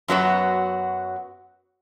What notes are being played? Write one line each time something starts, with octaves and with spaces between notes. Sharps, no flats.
F#2 F#3 B3 F#4